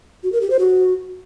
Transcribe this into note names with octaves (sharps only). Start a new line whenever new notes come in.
F#4
A#4
G4
C5
F#4